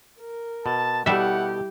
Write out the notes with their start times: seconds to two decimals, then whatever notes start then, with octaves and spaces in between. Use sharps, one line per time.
0.20 A#4
0.66 B2 A5
1.06 B2 G3 E4 G4 A4 E5 F#5